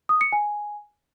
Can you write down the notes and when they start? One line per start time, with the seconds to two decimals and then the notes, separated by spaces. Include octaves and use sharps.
0.09 D#6
0.21 C#7
0.32 G#5